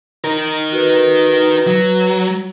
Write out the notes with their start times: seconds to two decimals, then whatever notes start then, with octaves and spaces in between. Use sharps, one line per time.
0.24 D#4 A#4
0.72 F#4 B4
1.67 F#3